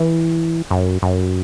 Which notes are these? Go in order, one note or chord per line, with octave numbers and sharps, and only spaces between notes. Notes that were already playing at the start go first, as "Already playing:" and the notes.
Already playing: E3
F#2
F#2